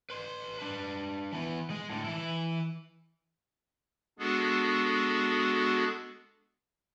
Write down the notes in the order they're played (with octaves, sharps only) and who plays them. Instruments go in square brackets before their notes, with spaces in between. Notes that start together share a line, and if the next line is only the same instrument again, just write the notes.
[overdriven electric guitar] B4 C6
D4 B4
E3 B3
G#3
A2 D3
E3 E4
[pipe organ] G#3 B3 D4 F#4 G#4 A4